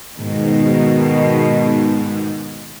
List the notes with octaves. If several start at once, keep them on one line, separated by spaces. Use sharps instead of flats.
G#2 B2 D#3